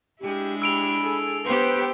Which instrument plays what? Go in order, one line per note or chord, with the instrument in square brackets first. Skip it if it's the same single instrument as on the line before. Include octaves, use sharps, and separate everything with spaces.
[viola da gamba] G#3 D4 E4 [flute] G4
[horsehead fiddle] G4 [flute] B5 [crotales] E6 D7 F7
[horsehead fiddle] G#4 A4
[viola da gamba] B3 G4 [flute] B4 [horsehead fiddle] C5 G5